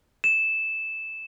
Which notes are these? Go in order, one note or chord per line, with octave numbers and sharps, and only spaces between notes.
E7